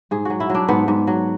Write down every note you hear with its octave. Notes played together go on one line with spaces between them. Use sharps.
G#2 G#4
F#3 F#4
E4
F#3 D4
G#2 B3
G#2
F#3